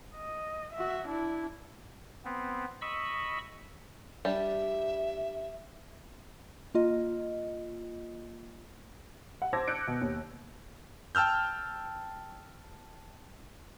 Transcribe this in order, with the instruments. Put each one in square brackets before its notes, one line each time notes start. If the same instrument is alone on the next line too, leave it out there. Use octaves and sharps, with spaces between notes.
[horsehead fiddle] D#5
F#4 E5
D4 E4
[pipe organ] B3 C4
D#5 B5 C#6 E6
[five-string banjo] G3 D4 G4 [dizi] E5
[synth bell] A#3 F4 D#5
[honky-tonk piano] F#5
C5 A5 D6 E6 G#6 A#6
D6 F#6 G6 C#7 D7
B2
D#2
[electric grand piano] G5 A5 E6 F6 G6